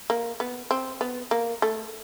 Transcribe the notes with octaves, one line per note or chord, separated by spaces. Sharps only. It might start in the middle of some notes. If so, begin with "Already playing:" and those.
A#3
B3
C4
B3
A#3
A3